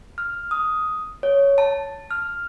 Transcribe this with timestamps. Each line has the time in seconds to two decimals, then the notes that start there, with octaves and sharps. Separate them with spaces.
0.18 F6
0.51 D#6
1.23 C#5
1.58 A5
2.11 F6